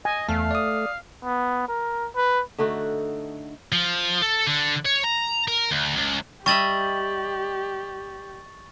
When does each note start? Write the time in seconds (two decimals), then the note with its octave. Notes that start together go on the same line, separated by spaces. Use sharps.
0.05 D#5 G#5
0.29 E2 A3 F5 A5
0.51 D5 D#6
1.24 B3
1.68 A#4
2.16 B4
2.58 D3 A3 D#4 F#4
3.72 F3
4.22 A4
4.47 D3
4.86 C#5
5.04 A#5
5.48 A#4
5.71 D2
5.96 C#2
6.46 G3 G4 D#5 E5 C#6 A6 F#7